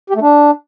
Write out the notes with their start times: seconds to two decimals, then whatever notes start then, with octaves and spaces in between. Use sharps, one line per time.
0.10 G4
0.16 A3
0.22 D4